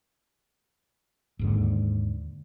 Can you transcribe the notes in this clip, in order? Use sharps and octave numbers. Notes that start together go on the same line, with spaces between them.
D#2 G#2 D3